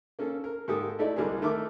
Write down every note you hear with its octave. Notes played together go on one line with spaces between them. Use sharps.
A#3 C#4 A4
A#4
G#2 A#3 G4 A4 D#6
A3 D#4 E4 A4 D5
C2 G3 G#3 A#3 G#4
D#3 A3 A#4 E5 D6